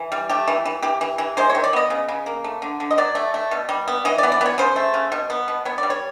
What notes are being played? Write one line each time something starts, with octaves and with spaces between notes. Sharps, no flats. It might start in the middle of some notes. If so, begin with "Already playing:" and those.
Already playing: E3
G3
A3 G4
E3
E3
E3 G4
E3
E3
G#3 C5
C#5
D#3
D5
B3 D#5
C#3
C#3
A#3
A3
D3
D3
D#5
F#3 D5
A3
A3
B2
G3
B3
E3 D#5
D5
B3
D5
B3 C#5
C#3 C5
A3
C#3
B2
B3
B2
B3 C#5
D5
G3
C#5